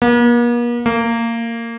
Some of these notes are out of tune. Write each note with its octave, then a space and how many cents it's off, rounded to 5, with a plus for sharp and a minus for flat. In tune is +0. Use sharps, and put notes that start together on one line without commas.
A#3 +45
A#3 -20